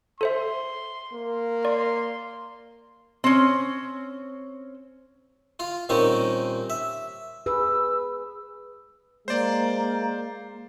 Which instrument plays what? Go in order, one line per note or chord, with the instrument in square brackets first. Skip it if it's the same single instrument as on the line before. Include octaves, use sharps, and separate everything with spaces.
[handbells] A4 C5 E5 [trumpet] C6
[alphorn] A#3
[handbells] D5 [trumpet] C6
[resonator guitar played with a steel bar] C4 C#4
[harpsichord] F4 F5
A#2 D#3 G3 C4 C#4 D#4
E5
[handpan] G#4 B4 [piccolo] E6
[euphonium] G#3 [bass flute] A#3 [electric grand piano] C5 D5